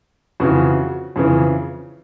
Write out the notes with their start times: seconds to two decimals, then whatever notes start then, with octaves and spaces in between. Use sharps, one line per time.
0.40 F2 C#3 E3 F#4
1.16 F2 C#3 E3